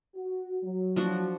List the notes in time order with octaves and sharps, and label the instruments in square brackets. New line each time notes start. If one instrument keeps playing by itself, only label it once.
[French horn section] F#4
F#3
[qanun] F3 D4 F#4